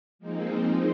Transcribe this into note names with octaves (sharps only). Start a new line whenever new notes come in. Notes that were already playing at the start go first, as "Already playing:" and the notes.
F3 G#3 A#3 C4 D#4